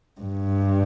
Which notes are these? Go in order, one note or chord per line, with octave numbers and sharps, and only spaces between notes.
G2